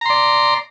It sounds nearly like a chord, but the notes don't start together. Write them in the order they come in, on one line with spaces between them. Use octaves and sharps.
A#5 C6 D5